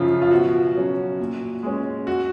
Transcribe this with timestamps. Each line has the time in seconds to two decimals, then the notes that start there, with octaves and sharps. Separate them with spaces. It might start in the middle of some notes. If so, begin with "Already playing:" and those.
Already playing: F#2 C#3 F3 F4
0.22 F4
0.31 B2 F#4
0.75 F#3 C#4
1.19 A#2
1.63 G#3 C#4
2.07 F#4